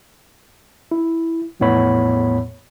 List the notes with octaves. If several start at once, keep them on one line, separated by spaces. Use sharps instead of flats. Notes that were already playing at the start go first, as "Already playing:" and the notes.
E4
A#1 E2 A2 B3 C#5 B5